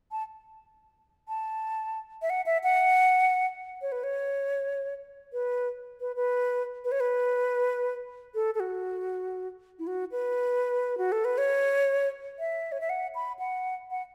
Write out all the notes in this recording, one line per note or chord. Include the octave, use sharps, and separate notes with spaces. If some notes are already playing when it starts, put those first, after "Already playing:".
A5
A5
E5
F#5
E5
F#5
C#5
B4
C#5
B4
B4
B4
B4
C#5
B4
A4
A4
F#4
E4
F#4
B4
F#4
A4
B4
C#5
E5
C#5
E5
F#5
B5
F#5
F#5